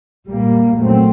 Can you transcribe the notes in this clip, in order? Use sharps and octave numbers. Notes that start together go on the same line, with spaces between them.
A#2 G3 A#3
A#2 F#3 A3 C4